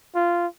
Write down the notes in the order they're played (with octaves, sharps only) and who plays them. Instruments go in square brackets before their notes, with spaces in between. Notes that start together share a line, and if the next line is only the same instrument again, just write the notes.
[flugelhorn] F4